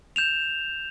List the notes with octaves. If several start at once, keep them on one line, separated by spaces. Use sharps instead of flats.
G6 E7 F7